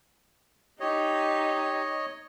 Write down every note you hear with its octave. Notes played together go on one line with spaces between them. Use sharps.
D#4 G4 C#5 D#5